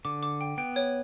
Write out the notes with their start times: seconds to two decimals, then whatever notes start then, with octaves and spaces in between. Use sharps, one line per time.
0.05 D3 D6
0.23 D6
0.41 G5
0.58 B3 G5
0.76 C#5